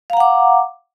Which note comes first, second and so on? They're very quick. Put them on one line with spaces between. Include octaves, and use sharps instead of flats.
F5 A#5 F#5 D6